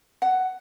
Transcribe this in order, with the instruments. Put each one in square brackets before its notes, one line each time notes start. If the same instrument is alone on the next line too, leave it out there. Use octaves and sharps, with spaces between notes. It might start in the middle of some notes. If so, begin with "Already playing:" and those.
[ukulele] F#5